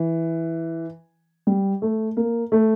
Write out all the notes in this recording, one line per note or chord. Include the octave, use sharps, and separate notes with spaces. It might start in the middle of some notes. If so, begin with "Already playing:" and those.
Already playing: E3
G3
A3
A#3
A3